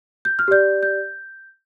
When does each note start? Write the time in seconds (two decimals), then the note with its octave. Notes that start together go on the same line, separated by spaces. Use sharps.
0.25 G6
0.39 F6
0.48 G4 D5 G6
0.83 G6